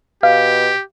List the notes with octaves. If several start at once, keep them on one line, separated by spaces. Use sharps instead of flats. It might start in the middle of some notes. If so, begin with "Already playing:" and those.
B2 G4 F5